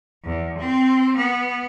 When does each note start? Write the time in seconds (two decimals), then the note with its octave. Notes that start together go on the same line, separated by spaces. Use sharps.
0.25 E2
0.58 C4
1.16 B3